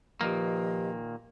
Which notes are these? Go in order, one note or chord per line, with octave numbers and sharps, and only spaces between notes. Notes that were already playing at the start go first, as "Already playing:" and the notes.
A#2 D#3 F3 A#3 G4 B4 D#5